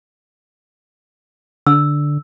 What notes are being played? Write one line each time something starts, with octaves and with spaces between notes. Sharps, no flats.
D3 E6